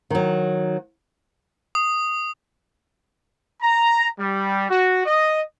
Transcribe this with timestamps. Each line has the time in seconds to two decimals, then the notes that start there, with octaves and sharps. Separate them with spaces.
0.10 D#3 F#3
1.75 D#6
3.62 A#5
4.19 G3
4.69 F#4
5.06 D#5